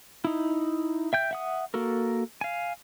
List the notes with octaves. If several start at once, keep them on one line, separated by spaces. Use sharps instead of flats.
D#4 E4
E5 G5 G6
E5 F#5 D#6
A#3 F#4 A4 A#4
F5 G#5